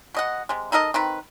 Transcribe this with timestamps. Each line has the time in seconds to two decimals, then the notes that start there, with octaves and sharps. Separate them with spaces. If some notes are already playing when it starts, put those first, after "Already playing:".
0.14 B2 D#5 F#5
0.49 C3 G#3
0.72 D#4 A4 A#4 D#5
0.94 D#3 C4 B4